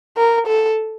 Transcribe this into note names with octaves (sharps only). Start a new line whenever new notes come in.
A#4
A4